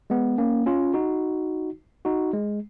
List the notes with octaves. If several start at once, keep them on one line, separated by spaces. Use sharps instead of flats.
G#3 B3
A#3 C#4
C#4 F4
D#4 F#4
D#4 F#4
G#3